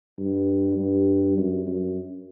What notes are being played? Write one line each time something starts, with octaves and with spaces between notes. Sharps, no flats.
G2
G2
F#2
F#2